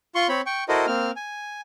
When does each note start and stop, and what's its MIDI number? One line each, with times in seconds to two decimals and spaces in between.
0.15 0.27 65
0.15 0.27 84
0.15 0.27 85
0.29 0.41 60
0.29 0.41 73
0.29 0.41 83
0.46 0.64 79
0.46 0.64 85
0.69 0.86 64
0.69 0.86 66
0.69 0.86 69
0.69 0.86 70
0.69 0.86 72
0.69 0.86 75
0.87 1.11 58
0.87 1.11 60
0.87 1.11 89
1.16 1.61 80